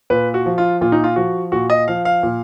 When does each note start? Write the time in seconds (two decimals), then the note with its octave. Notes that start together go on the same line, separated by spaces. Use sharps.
0.10 A#2 B4
0.34 F#4
0.46 F3
0.58 F4
0.81 A#2 F4
0.92 D#4
1.04 F4
1.16 F3 F#4
1.52 A#2 F#4
1.70 D#5
1.88 F3 F5
2.05 F5
2.23 A#2